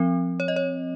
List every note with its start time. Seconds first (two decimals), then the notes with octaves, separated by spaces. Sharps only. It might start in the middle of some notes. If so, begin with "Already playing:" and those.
Already playing: F3 C4
0.40 C#5
0.48 D#5
0.56 C#5